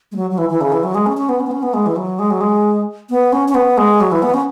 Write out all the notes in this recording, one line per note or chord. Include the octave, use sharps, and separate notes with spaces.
G#3
F#3
F#3
E3
E3
C#3
E3
F#3
G#3
C#4
C#4
B3
C#4
B3
C#4
B3
G#3
E3
F#3
G#3
F#3
G#3
B3
C#4
C#4
B3
G#3
F#3
E3
B3
C#4